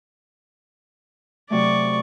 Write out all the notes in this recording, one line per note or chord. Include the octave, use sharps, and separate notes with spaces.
C3 F#3 A3 D5 C#6